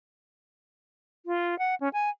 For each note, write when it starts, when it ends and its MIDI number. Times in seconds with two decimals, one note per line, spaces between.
1.26 1.58 65
1.59 1.75 78
1.81 1.89 61
1.93 2.09 80